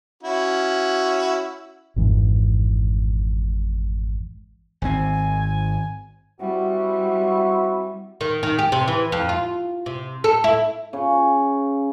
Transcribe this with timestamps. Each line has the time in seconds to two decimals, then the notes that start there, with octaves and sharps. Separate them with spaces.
0.23 C#4 E4 F#4
1.96 G#1 F2 G#2 E3
4.82 G#1 C3 C4 G#5
6.41 G3 C4 E4 F#4
8.21 D#3
8.43 D#3
8.59 G4
8.72 C3
8.88 E3
9.12 F2
9.29 F4
9.86 C3
10.24 A4
10.44 E4
10.93 C#3